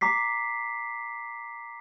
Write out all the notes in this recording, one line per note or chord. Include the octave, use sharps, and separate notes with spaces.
A#5 D6 B6 C7